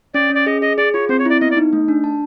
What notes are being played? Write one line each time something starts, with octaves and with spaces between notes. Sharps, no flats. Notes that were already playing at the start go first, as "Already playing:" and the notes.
C#4 D5
C#4
D5
G#4 D#5
G#4 D#5
G#4 D5
F4 C#5
C4 C5
C#5
E4 D5
B3 D#5
D5
D#4
A3
D4
A5